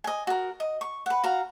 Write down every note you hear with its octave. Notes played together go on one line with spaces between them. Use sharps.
D#5 G#5
F#4 A#4
D#5
C#6
B4 F#5
F#4 F5 A#5